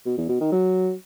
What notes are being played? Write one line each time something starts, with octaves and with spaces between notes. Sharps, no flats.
B2
E2
B2
D#3
F#3